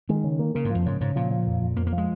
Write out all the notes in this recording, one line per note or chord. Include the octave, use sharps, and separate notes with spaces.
D#3 G#3
C#3
A#3
C#3 A#3
G#2
F3
F2
G#2 C#3
G#2 C#3
A#2 F3
F3
F2
F2
F2 A#3
A#3
F3
G#3